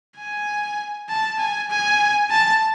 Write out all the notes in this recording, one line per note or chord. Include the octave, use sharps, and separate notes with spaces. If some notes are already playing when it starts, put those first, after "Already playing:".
G#5
A5
G#5
G#5
A5